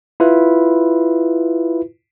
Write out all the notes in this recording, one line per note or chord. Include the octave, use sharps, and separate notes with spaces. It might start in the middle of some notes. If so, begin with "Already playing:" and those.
E4 F4 B4